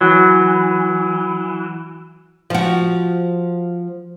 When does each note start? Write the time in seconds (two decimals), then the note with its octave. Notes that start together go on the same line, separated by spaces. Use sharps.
0.01 E3 F#3
2.50 F3 F#4